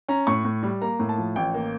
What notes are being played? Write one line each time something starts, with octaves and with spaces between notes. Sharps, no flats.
C#4 A#5
A2 C#6
A2
G3
A#3 A#5
A2
A5
F3
A1 G5
A#3